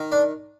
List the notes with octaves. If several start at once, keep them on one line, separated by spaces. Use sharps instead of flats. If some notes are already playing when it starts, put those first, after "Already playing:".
Already playing: D#3
D4